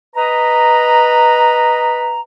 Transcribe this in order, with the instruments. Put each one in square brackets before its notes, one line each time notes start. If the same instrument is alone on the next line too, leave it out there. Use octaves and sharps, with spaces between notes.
[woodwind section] B4 D#5 A#5